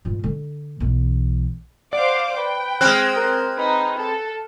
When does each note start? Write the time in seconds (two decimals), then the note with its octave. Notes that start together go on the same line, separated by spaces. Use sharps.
0.05 G2 F4
0.24 D3
0.80 B1 E3
1.93 C5 D5 F5 F#5 D6
2.37 B4 G5
2.81 G#3 C4 F6 F#6
3.17 A#4
3.58 D#4 B4
3.98 A4